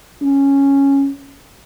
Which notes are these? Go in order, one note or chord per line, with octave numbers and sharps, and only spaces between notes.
C#4